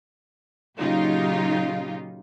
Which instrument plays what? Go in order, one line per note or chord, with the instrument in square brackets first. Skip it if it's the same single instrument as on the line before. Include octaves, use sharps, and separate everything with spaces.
[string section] A#2 C#3 F#3 D#4 F4 G4